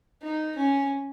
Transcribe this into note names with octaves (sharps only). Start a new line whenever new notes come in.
D#4
C#4